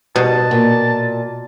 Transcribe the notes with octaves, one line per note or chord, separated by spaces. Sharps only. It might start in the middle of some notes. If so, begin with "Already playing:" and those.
B2 G3 A5
A#2